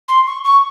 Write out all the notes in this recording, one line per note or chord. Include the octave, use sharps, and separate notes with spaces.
C6
C#6
C#6